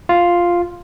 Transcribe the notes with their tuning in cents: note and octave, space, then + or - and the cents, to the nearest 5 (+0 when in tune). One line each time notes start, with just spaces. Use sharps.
F4 +0 F5 +0